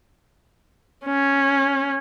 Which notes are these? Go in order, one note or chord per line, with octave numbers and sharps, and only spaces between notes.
C#4